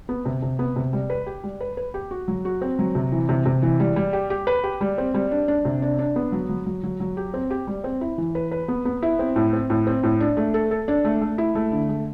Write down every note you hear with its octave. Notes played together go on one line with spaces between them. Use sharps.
B3
C3
C3
B3
C3
G3
B4
G4
G3
B4
B4
G4
F#4
F#3
F#4
C4
F#3
C3
E3
C3
C3
E3
G3
G3
G4
G4
B4
G4
G3
C4
G3
D4
D4
C3
D4
D4
B3
F#3
F#3
F#3
F#3
F#3
G4
C4
G4
G3
C4
E4
E3
B4
B4
B3
B3
E4
C4
A2
C4
A2
C4
A2
D4
A3
A4
A4
D4
A3
A3
E4
A3
D3
A3